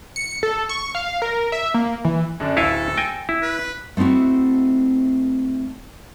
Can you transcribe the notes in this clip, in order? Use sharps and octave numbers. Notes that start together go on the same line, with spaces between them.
C#7
A4
C#6
F5
A#4
E5
A#3
E3
F#2 D3 D4
D1 E4 A4 F5 G#5 C#7
G5 G#5 A#6
E4
B4
A3 C4 D#4 E4 F#4